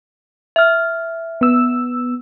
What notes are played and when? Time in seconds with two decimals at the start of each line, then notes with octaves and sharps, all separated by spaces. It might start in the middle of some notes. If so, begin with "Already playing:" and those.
0.56 E5 F6
1.41 B3 E6